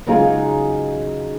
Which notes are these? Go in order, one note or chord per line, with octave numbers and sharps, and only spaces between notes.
C#3 F#3 G#3 D#4 F4 G#4